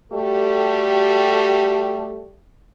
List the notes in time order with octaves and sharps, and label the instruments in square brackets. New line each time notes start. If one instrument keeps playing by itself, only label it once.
[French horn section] G3 A3 F#4 G4 A4